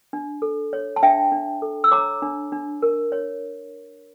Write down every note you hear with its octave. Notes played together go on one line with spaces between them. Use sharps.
D4
A4
C#5
A5
D4 E5 G5
D4
A4
E6
C#5 A#5 D6
D4
D4
A#4
C#5